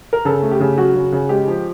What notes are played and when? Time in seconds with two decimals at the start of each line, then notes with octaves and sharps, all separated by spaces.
0.13 A#4
0.25 C#3 A4
0.43 A3
0.51 G4
0.60 C#3
0.77 F#3 F#4
0.95 C#3
1.12 C#3
1.29 G#3 G4
1.48 F3